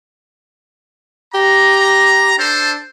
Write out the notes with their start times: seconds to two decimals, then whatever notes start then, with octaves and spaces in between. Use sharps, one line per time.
1.35 G4 A#5
2.39 D4 A4 C5